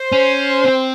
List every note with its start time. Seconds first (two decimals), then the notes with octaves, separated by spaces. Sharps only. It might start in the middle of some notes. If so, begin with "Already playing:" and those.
Already playing: C5
0.12 C#4
0.64 C4